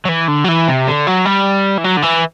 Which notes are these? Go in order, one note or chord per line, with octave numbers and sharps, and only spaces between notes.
F#3
E3
D3
F#3
E3
C3
D3
F#3
G3
E3
F#3
D3
E3